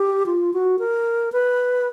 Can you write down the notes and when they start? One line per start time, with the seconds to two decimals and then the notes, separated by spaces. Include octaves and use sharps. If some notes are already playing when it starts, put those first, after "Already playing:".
Already playing: G4
0.26 F4
0.53 F#4
0.79 A#4
1.32 B4